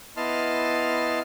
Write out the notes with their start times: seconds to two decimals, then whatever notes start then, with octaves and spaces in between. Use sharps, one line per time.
0.17 B3 E4 D#5 A5 C6 F6